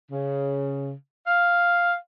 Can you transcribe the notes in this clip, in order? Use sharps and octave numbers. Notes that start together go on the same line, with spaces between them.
C#3
F5